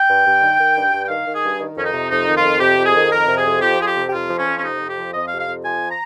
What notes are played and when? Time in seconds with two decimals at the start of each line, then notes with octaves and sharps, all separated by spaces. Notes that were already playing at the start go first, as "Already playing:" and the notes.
Already playing: G5
0.08 G2
0.25 G2
0.41 D#3
0.59 D#3
0.75 G2
0.92 G2
1.04 G5
1.08 D#3 F5
1.26 D#3
1.34 G#4
1.43 G2
1.60 D#3
1.76 F2 C#4
1.84 D#4
1.93 C3
2.10 F2 D#4
2.27 D#3
2.36 F4
2.44 F2
2.60 C3 G4
2.78 F2
2.86 G#4
2.95 D#3
3.11 F2 A#4
3.28 C3
3.37 G#4
3.45 F2
3.62 F3 G4
3.78 F2 G#4
3.87 G4
3.96 C3
4.09 G4
4.12 F2 F4
4.30 F3
4.38 C#4
4.46 F2
4.58 C#4
4.63 C3 D#4
4.80 F2
4.89 G4
4.98 F3
5.13 F2 D#5
5.27 F5
5.32 C3
5.39 F5
5.47 F2
5.64 F3 G#5
5.90 A#5